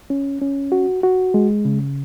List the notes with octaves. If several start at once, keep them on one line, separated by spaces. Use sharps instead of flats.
C#4
C#4
F#4
F#4
G#3
C#3